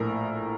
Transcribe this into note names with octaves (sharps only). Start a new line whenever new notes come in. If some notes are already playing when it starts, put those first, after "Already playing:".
Already playing: A#1 A2 A#4